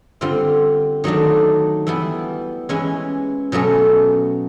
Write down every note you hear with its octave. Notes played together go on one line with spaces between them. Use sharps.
D3 G3 C4 F4
D#3 F#3 A3 D4
E3 G3 B3 E4
E3 G#3 C#4 E4
B2 F#3 A3 C#4